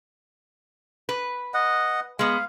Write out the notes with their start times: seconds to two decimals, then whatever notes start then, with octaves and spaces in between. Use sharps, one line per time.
1.09 B4
1.54 D#5 F#5
2.19 G#3 B3 F5